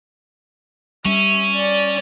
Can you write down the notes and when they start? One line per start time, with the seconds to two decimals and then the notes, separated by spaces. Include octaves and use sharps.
1.05 G3 C#4 E5
1.55 D5